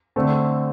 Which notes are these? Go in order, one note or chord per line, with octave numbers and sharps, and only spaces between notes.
D3 A3 C4